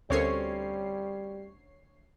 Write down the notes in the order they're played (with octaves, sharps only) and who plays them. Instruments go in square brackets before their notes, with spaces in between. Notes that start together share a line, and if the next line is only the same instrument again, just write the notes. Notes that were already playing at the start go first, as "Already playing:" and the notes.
[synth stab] D2 C#5 C7 [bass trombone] G3 [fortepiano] C4 C#4 [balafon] A4 A#4